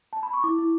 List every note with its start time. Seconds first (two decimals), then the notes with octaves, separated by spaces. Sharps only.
0.13 A5
0.23 B5
0.33 C#6
0.43 E4 D6
0.59 E4